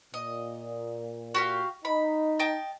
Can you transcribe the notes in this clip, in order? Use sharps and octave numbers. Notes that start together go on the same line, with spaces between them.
A#2 D#5
F#4 G4 F5
D#4 B5
D#5 G5 A5